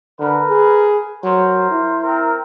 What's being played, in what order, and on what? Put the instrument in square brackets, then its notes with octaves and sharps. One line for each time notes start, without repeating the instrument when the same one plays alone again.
[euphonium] D3 [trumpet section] A#4 B4
[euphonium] G#4
[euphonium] F#3 [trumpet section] A#4 C5
[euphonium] E4
[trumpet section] C4 A#4